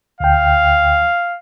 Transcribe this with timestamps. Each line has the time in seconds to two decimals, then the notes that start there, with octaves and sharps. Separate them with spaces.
0.20 D2 F5 G5